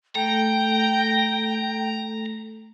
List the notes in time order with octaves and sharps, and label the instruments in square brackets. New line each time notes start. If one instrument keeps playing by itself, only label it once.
[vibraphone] A3 A4 [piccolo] G5 [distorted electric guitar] A#5